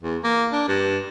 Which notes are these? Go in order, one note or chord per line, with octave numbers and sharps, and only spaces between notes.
E2
A#3
D4
G2